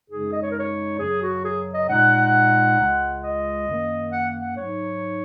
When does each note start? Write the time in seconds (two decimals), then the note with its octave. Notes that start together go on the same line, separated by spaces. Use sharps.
0.09 F#2 C#3 G#3 D#4 G#4
0.33 D#5
0.42 C#5
0.51 A#4
0.59 C#5
0.99 F#2 C#3 F#3 G#4
1.21 F#4
1.44 G#4
1.73 D#5
1.88 A#2 G#3 D#4 F#5
2.77 C#2 C#3 G#3
3.22 D#5
3.67 F#2 D#3 A#3
4.11 F#5
4.41 F#5
4.56 G#2 F#3 D#4 C#5